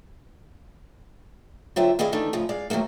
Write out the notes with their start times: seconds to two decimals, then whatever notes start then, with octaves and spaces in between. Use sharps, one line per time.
1.76 D3 F#3 F4 C5 E5 G5
1.99 D#3 E4 G#4 D5 D#5 F5
2.12 D#3 E3 A3 D4 D#4
2.33 A2 C#3 F3 D#4
2.49 G#3 D5 F5
2.70 G#2 D#3 F#3 A3 A#3